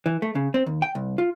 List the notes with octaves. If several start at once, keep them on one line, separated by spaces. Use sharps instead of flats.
E3
A3
C#3
C4
D#2
G5
C2
F4